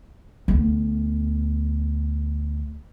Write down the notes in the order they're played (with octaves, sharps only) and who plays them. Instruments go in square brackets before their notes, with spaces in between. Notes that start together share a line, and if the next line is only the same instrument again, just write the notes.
[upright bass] D2 B3